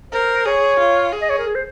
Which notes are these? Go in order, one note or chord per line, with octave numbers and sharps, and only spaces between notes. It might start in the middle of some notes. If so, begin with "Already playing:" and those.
A#4 C5
G#4 C#5
F4
G#4
D#5
C#5
A#4
G#4
C5